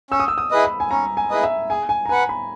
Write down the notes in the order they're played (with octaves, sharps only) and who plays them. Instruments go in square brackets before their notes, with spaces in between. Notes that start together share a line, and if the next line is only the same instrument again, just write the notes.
[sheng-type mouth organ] C#4 [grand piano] E6
[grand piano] D#6
E6
D#6
[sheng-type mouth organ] E4 G#4 B4 D#5
[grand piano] B5
G#5
[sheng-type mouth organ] C#4 [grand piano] A#5
[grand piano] G#5
[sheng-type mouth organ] E4 G#4 B4 D#5
[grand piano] E5
[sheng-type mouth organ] G#4 [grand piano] G#5
[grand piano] G#5
A#5
[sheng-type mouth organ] B4 F#5 [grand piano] G#5
[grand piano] B5